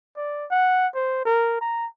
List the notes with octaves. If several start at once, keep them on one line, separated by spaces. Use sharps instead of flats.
D5
F#5
C5
A#4
A#5